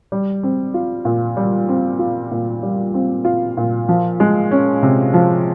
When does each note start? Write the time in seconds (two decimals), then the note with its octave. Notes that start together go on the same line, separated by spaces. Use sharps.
0.12 G3
0.43 C4
0.74 F4
1.05 A#2
1.37 G3
1.69 C4
1.99 F4
2.31 A#2
2.63 G3
2.94 C4
3.25 F4
3.57 A#2
3.89 F3
4.20 G#3
4.51 C#4
4.82 C3
5.14 F3